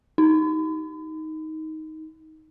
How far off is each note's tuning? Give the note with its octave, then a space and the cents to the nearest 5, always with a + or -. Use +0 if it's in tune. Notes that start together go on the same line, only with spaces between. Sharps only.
D#4 +15